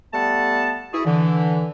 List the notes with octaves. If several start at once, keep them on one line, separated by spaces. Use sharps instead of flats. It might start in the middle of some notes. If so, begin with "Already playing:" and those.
G3 A3 B3 F#5 A5
E4 F#4 G#4
D3 E3